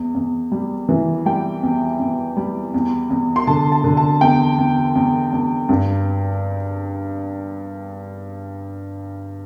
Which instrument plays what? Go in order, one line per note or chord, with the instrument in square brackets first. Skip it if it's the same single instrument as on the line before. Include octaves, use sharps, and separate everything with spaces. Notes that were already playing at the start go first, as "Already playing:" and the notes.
Already playing: [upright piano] E2
E2
G3
E3
G3 G5
E2
E2
G3
E2
E2
C6
D3 A5
A5
D3
A5
E2 G5
E2
E2
E2
G2